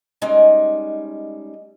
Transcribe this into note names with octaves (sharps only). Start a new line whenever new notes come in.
G3 G#3 C#4 D#4